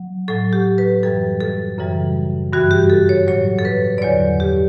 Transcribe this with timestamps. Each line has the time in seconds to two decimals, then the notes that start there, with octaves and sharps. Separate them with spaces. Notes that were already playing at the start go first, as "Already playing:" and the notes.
Already playing: F#3
0.28 A2 F#3 A4
0.53 G4
0.78 B4
1.03 F#2 E3 G3 A4
1.41 A4
1.78 F#2 C#3 E3 G3
2.53 G2 E3 G3 F#4
2.71 G4
2.90 A4
3.09 C#5
3.28 A2 F#3 C#5
3.59 A4
3.65 B4
3.98 D5
4.02 E2 D3 F#3 C#5
4.40 G4